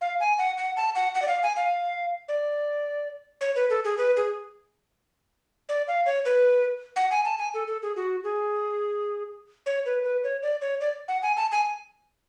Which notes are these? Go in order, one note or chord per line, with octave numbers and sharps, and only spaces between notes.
F5
G#5
F#5
F#5
A5
F#5
F#5
D5
F5
G#5
F5
D5
C#5
B4
A4
G#4
B4
G#4
D5
F5
C#5
B4
F#5
G#5
A5
G#5
A4
A4
G#4
F#4
G#4
C#5
B4
B4
C#5
D5
C#5
D5
F#5
G#5
A5
G#5